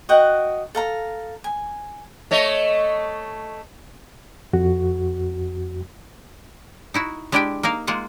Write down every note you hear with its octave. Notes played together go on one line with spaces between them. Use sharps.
F#4 D#5 F#5 G5
A4 F5 A#5
G#5
A3 C#5 D#5
F2 F#4
D#4 E4 F#4
G#3 D4 E4 G4 D5 G5
A#3 D#4 A#4 F5
G#3 A#3 F4 F#5